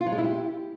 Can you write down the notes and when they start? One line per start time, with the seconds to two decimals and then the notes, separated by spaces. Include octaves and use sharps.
0.01 F4
0.06 F#3
0.12 G#3
0.18 E4
0.24 G4